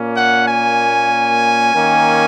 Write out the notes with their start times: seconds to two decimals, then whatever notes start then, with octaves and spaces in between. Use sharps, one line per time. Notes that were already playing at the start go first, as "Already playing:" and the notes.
Already playing: A#2 A#3 C#4
0.16 F#5
0.48 G#5
1.73 D#3 A#3 C#4